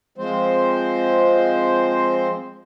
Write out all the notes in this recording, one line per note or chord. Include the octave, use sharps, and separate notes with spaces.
F3 G#3 C4 C5